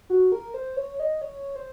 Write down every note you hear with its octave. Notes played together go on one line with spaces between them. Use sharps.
F#4
A#4
C5
C#5
D#5
C#5
C5